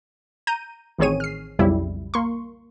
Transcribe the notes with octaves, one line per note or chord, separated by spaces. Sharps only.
A#5 G6 D#7
A1 D#3 C4 G#4 C#5 D#7
F6 C7
B1 F2 C#3 G3 E4
A#3 C6 C#6